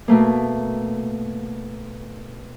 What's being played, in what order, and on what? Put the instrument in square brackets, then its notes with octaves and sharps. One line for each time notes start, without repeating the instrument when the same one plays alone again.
[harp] B2 A3 A#3